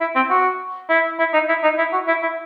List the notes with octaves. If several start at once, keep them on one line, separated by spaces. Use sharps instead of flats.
E4
C4
F#4
E4
E4
D#4
E4
D#4
E4
F#4
E4
E4